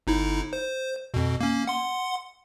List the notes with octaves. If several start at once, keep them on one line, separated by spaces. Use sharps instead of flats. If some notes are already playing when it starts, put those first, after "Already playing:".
G1 D#4 E4
C5
F2 B2
A#3 C#4
F#5 C6